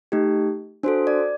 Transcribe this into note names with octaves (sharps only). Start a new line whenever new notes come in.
A3 D#4 G4
D4 F#4 A4 C5
D5